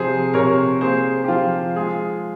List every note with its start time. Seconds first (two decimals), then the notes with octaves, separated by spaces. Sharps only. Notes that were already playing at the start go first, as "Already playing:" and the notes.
Already playing: C3 F3 G#4 C5
0.34 C3 A#4 C#5
0.81 A#3 G#4 C5
1.24 G4
1.28 F3 F4
1.76 G#3 F4 G#4